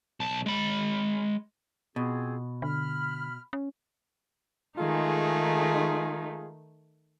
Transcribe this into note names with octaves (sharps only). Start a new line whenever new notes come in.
B1 A5
G#3 B5
B2 C4 F4 G#4
D3 B5 F6
C#4
D#3 G#3 A3 D#4 F4 G#4